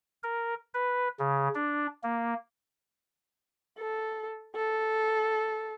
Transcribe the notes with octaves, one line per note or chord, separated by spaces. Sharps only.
A#4
B4
C#3
D4
A#3
A4
A4